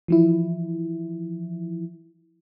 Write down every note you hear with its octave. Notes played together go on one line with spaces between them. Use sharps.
E3 F3 E4